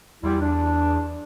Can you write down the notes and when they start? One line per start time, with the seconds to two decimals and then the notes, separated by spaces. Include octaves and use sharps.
0.23 E2 G3 E4 F4
0.40 D4